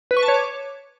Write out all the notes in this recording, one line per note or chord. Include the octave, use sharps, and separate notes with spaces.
B4
C#6
A5
C#5
D6